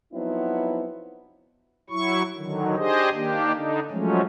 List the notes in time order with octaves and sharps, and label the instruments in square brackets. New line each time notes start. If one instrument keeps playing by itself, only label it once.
[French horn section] F3 F#3 B3 C4 D#4 E4
[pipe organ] F#3 E4 C#6
D3 D#3 F#3
D4 G4 G#4 C5 D#5
D#3 A#3 D4 G4
D3 D4 D#4
F3 F#3 G#3 A3 C#4